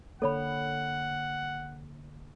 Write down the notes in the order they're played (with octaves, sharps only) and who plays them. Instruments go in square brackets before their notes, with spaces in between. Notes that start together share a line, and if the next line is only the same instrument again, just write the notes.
[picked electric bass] D3 A#3 [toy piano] A4 C#5 B5 [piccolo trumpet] F#5